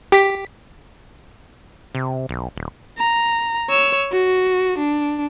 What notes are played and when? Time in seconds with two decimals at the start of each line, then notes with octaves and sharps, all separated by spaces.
0.12 G4 B6
1.95 C3
2.29 B1
2.56 D#1
2.98 A#5
3.70 C#5 E6
4.12 F#4
4.78 D4